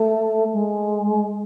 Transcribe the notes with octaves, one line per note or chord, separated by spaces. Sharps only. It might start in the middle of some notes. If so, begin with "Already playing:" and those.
Already playing: A3
G#3